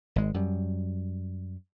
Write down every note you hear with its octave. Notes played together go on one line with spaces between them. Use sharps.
G#1 G#3
F#2 G3